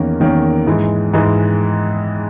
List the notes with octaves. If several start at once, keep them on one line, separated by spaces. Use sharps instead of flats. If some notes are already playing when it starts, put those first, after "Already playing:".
Already playing: E2 D#3 A#3 C#4
E2 D#3 A#3 C#4
G#2 E3 G#3
G#2 E3 G#3